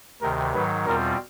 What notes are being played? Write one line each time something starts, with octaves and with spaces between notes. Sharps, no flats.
D2 C3 D#3 A#4
G#2 D#3 F#3 B4
E2 B2 G3 C4 F4 A#4